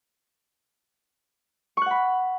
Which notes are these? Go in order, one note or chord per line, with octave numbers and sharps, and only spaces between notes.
F#5 B5 C#6 F#6